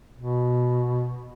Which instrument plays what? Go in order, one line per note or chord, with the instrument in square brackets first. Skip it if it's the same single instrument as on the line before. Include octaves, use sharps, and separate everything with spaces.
[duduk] B2